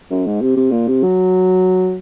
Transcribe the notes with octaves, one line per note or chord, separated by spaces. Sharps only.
F#2
G#2
C3
C3
A#2
C3
F#3